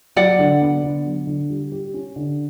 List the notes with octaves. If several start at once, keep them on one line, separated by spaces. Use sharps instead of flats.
F#3 D5 F#5
D3
B3
D3
F#3
D3
G3
G4
C#4
D3